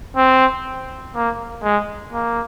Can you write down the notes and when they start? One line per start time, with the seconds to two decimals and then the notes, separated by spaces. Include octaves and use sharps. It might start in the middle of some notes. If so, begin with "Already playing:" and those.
0.17 C4
1.15 A#3
1.63 G#3
2.13 A#3